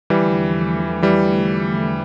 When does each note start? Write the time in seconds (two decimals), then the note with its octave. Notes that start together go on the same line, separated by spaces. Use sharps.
0.10 E2 D3 E3 F3 G3 A3
1.02 E3 G3